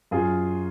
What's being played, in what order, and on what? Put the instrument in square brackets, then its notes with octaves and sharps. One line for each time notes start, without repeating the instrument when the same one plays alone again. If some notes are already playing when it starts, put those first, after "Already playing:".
[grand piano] F#2 F4 G#4